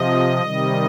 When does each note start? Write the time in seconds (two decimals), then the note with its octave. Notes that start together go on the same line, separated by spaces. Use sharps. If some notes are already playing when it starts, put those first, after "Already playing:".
Already playing: C3 F3 D#5
0.42 C3 D#3 G3